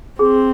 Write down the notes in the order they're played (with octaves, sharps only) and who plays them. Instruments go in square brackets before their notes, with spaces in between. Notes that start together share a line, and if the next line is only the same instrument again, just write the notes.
[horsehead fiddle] C4 [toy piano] G#4